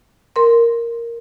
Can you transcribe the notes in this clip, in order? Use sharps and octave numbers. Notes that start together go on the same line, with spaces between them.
A#4 C6